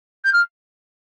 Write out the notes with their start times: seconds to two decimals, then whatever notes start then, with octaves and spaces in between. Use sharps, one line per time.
0.24 G6
0.33 F6